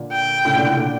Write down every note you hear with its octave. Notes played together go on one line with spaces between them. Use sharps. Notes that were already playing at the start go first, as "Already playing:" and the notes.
Already playing: A#2 D3
G5
A2 C#3
A#2 D3
A2 C#3
A#2 D3